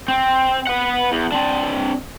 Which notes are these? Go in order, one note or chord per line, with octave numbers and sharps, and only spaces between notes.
C4
B4 F#5
E2
C4 D4